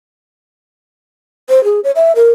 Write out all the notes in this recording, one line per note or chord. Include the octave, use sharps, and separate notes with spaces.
C5
G#4
C#5
E5
A#4